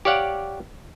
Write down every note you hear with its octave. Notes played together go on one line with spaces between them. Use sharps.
G4 C#5 D5 F5 F#5